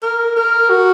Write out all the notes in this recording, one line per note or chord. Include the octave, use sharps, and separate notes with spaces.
A#4
A#4
F#4